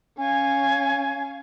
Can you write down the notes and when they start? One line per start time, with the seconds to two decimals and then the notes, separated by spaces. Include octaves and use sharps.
0.18 C#4 F5 G#5